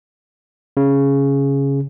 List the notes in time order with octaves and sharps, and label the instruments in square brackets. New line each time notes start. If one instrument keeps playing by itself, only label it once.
[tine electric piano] C#3